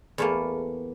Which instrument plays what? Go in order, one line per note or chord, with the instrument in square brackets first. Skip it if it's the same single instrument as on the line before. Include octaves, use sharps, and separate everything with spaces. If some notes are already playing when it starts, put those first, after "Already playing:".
[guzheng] E2 A3 A#3